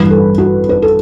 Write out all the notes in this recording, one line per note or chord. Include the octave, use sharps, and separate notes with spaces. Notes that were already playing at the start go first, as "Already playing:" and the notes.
Already playing: A1 G2 E3 G3 B4
A4
F#4
B4
A4